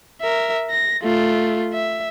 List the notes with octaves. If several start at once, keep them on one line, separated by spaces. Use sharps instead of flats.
A#4 E5
A#6
A3 F4
E5